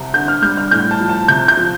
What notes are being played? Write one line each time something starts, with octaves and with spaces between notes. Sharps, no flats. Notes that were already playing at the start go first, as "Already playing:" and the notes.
Already playing: C2 C3
D3 G6
F6
G3 G6
F6
A2 G6
A5
F3
A5
C3 G6
G6
F3